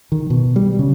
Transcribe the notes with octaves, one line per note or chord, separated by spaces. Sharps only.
D#3
B2
G3
C#3